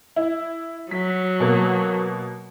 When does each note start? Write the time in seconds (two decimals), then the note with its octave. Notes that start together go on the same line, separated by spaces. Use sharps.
0.16 E4
0.91 F#3 B6
1.40 B2 A#3